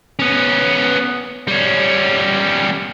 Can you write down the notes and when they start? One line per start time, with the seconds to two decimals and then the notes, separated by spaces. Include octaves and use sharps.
0.19 B3 C#4
1.48 G3 C#4